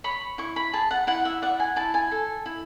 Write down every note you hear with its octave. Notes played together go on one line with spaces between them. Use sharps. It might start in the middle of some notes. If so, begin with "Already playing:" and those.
C#5 B5
E4 C#6
B5
G#4 A5
F#5
E4 F#5
E5
D5 F#5
G#5
E4 A5
G#5
A4
E4